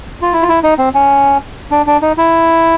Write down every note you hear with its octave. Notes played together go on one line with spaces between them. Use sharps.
F4
E4
F4
E4
D#4
C4
C#4
D4
D4
D#4
E4